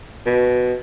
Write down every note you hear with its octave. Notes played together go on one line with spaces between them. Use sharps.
B2